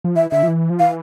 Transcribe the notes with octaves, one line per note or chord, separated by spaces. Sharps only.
F3
E3 E5
D3 E5
F3
E3
F3
E3 F5